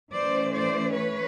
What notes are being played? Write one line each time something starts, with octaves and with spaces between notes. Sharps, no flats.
E3 A3 C#4 C5 D5
C5 D5
B4 C#5